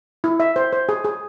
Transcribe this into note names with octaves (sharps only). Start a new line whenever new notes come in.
E4
E5
C5
C5
G#4
G#4